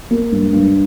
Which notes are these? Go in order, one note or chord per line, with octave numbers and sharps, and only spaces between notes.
A#3
G2
G2